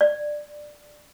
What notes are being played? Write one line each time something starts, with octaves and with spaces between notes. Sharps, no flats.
D5